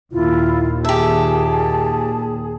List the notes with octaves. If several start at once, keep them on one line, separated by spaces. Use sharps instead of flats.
D#2 A#2 E4 F4
G4 G#4 E5 A5